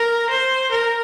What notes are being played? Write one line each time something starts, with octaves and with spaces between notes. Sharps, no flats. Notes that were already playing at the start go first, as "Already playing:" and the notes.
Already playing: A#4
C5
A#4